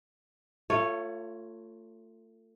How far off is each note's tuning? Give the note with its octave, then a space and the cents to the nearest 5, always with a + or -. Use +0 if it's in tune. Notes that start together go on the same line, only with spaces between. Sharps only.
A3 +30 F4 +0 C#5 -5